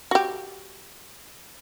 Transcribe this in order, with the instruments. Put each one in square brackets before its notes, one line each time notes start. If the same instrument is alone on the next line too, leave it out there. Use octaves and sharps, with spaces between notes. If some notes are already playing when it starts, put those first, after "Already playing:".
[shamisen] F#4 G4